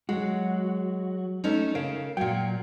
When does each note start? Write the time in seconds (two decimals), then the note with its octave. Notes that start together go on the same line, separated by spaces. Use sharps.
0.09 F#3 G#3 F#4
1.44 A3 C#4 D#4
1.75 C#3 A#4 F5
2.17 A#2 F#3 F5 G5